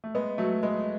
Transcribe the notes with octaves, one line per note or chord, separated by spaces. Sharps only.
A3
G#3 B3
F#3 A3
G#3 B3